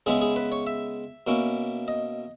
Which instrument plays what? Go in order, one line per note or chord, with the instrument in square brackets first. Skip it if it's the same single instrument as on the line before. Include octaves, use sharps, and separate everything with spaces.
[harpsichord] C#3 G#3 B3 E4 G#4
G#4
B4
C#5
E5
B2 A#3 C#4 E4
D#5